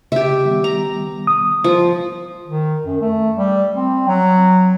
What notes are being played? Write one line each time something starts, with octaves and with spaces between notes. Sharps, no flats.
C#3 G4 E5
D#3 G3 B3
A#5
D#6
F3
D#3
F#2
A3
G3
C4
F#3